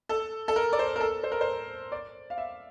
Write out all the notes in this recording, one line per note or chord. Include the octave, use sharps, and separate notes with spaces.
A4
A4
A#4
D5
C5
A#4
A4
C5
A#4
C5
D5
F5
E5